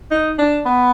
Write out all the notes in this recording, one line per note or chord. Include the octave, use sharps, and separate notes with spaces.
D#4
D4
B3